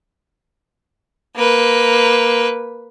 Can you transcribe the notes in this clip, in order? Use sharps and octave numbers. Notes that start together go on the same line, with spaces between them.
A#3 B4